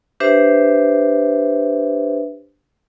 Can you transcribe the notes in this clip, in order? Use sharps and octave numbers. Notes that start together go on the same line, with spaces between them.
D4 G4 B4 C5 E5